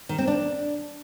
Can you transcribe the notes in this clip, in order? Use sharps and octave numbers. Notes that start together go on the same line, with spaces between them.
D#3
C4
D4